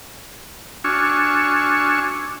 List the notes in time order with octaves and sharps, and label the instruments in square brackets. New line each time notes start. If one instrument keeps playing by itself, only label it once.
[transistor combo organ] D4 F#4 G#5 C#6 E6 F6